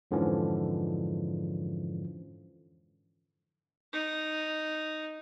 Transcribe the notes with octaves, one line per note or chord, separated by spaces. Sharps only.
F2 G#2 D3 E3 F3 C#4
D#4